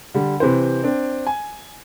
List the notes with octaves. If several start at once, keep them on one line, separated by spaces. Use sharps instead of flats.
D3 G3
C3 E3 B4 C5
C4 D4
G#5